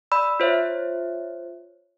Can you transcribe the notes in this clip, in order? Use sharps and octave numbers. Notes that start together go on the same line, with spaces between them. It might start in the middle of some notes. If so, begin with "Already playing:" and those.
D5 B5 E6
F4 C5 C#5 E5